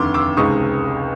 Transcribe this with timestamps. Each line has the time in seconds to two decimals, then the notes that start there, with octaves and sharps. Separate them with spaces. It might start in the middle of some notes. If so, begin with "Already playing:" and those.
Already playing: F1 D#2 D3 C6 D6
0.14 D6 E6
0.37 C#2 C3 D#3 G#3 C#6 D#6